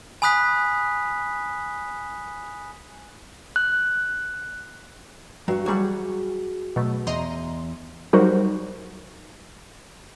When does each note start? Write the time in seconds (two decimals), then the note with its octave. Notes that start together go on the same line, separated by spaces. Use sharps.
0.22 G#5 B5 D#6 F#6 B6
3.56 F#6
5.48 G2 F#3 F#4
5.66 E3 F#3 G3 F#4 G#4 F#5
6.76 B2 F#3 A3
7.07 E2 D#5 A#5 C6
8.13 F#3 G3 D#4 F#4 A#4 C5